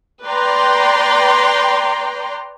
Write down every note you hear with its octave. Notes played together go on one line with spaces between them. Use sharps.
B4 D5 G5 A#5 C6